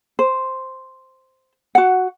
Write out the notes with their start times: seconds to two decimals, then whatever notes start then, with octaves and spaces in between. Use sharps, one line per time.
0.19 C5
1.75 F#4 F#5